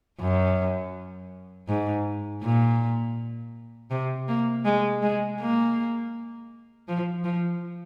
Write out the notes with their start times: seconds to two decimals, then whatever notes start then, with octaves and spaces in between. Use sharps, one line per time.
0.21 F#2
1.68 G#2
2.43 A#2
3.91 C3
4.28 A#3
4.65 G#3
5.03 G#3
5.40 A#3
6.88 F3
7.24 F3